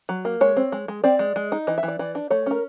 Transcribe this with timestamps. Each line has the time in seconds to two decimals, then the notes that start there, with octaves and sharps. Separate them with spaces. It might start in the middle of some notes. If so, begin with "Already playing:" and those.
0.09 F#3
0.25 A#3
0.41 G#3 C#5
0.57 C4
0.72 G#3
0.88 G#3
1.04 C4 D5
1.19 G#3
1.36 G#3
1.52 D#4
1.67 E3 D#5
1.78 E5
1.83 E3
1.88 D5
1.99 E3 D5
2.15 D4
2.30 A3 C#5
2.46 C#4 A#4